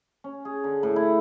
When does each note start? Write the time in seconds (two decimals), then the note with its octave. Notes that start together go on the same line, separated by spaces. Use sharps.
0.24 C#4
0.45 G#4
0.64 D3
0.83 A2
0.96 E4